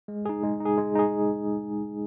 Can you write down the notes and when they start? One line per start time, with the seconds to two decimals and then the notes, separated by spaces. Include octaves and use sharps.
0.08 G#3
0.26 D#4 G#4
0.44 G#3
0.60 D#4
0.66 G#4
0.78 G#3
0.95 D#4 G#4